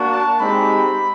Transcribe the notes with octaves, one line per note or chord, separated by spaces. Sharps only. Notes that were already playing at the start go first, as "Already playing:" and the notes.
Already playing: A#3 D4 F#4
A5
G#3 C4 D#4 G4 B5